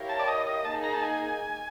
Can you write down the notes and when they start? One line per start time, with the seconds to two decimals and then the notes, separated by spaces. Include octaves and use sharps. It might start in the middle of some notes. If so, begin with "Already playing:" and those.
Already playing: E4 G4 A#4 C#5 F5
0.09 A5
0.19 D5
0.28 D#5
0.47 D#5
0.65 A#3 D#4 G#4 A5
0.84 A#5
0.94 A5
1.03 G#5